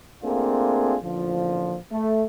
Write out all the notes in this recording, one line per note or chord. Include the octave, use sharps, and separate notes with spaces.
A3 A#3 C4 D4 F4 G#4
A1 A#2 D3 F3
A3